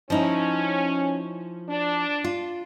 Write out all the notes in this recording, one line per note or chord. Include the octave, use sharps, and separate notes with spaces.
F3 C#4 D#4 E4
D4
F4